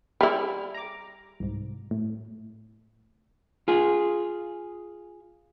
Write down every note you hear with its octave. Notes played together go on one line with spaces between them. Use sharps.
G3 E4 G#4 F6
A#5 D6
C2 G#2
A2
F4 G#4